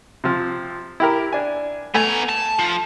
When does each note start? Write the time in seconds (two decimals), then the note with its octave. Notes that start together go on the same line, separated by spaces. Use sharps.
0.24 C3 F3
1.00 E4 G4 A#4
1.33 D4 G#5
1.94 A3 B3 G#5 A#5
2.29 A5
2.59 F3